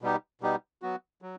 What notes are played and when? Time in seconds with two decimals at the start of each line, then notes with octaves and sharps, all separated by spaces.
0.02 B2 G3 B3 D#4 G4
0.41 B2 G3 B3 D#4 G4
0.82 F#3 B3 F#4
1.22 F#3